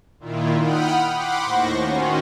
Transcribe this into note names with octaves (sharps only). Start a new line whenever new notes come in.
A#2 D#3 E4 F4
F#5 G5 B5 D#6 F6
F#5 B5 C6 D6
D#2 A2 C5 C#6 A#6
D#3 C#4 F4 F#4